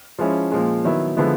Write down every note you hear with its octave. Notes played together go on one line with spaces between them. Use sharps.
F3 G#3 C#4 E4
A#2 F3 G#3
D#3 F#3 B3 E4
D3 F3 G#3 B3 E4